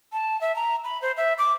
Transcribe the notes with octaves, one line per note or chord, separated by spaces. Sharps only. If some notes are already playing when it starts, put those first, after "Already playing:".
A5
E5
A#5
B5
C5
E5
D6